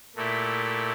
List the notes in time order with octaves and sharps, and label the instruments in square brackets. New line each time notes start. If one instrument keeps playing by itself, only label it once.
[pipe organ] A#2 A3 E4 G4